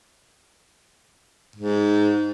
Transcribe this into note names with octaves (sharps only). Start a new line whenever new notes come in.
G#2